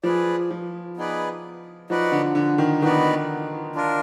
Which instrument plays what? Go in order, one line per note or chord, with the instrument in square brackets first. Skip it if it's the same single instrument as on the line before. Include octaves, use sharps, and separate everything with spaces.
[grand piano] F3 [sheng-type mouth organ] G#4 B4 D5
[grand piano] F3
[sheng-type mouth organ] B3 D#4 G#4 B4 D5
[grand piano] F3 [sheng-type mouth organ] D#4 F#4 B4 D5 F#5
[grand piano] D3
D3
D#3
[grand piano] D#3 [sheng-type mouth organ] B3 D#4 F#4 B4 D5
[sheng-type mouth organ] D4 F4 A#4